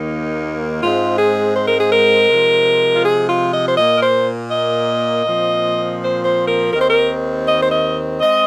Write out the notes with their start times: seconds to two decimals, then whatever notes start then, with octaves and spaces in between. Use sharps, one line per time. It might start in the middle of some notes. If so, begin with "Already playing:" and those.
Already playing: D#2 D#3 A#3 D#4
0.83 G#2 G#3 C4 F4
1.19 G#4
1.56 C5
1.68 A#4
1.81 G#4
1.93 A#4
2.30 C3 F3 G#3
2.95 F4
3.05 G#4
3.28 F4
3.53 D#5
3.69 C5
3.77 A#2 A#3 D#5
3.96 A#4
4.03 C5
4.52 D#5
5.25 A#2 F3 C4
6.00 C5
6.24 C5
6.48 A#4
6.73 D#2 D#3 C4 A#4
6.82 C5
6.88 A#4
7.47 D#5
7.63 C5
7.72 D#5
8.21 G#3 C4 D#5